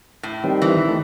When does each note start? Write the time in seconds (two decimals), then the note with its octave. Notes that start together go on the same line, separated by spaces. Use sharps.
0.23 A2
0.44 D#3 G3 C4
0.62 E3
0.89 D#3 A3